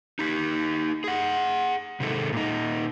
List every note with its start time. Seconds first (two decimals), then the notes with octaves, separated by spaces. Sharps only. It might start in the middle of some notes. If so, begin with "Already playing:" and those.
0.19 D#4 G4
1.04 G#4 F#5
2.00 C3 D#3 G#3 A4
2.33 A#2 D#4